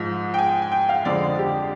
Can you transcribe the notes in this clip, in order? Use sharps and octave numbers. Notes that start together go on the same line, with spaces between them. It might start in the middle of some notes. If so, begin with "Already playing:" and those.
Already playing: G#2 F3 G#3
G5
G#5
G#5
G5
F5
F2 D3 G#3 C4 D5
G4